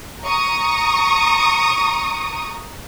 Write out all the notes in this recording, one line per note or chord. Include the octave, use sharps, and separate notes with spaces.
A#5 C#6 D#6